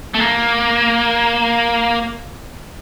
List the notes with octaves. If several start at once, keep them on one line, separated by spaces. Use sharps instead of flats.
A3
A#3